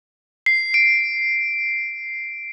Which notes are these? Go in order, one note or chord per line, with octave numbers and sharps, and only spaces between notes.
C7
D7